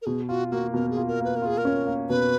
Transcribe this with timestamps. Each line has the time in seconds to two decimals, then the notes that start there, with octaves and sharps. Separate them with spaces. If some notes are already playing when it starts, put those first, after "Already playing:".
0.02 A#4
0.06 B2 G#4
0.28 F4 F#4
0.51 A#3 F#4
0.74 B2 A#4
0.91 G#4
0.97 F4
1.08 A#4
1.20 A#3 B4
1.36 A#4
1.42 F4 G#4
1.58 A#4
1.65 C#4
1.87 A#3
2.09 B2 B4